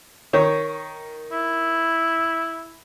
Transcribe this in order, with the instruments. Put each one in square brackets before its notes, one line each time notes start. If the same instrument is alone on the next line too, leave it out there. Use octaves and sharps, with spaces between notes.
[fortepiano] D#3 C#5
[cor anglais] E4